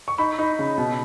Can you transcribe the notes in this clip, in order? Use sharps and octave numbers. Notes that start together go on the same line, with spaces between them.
C#6
D#4 B5
D#4
C#3
B2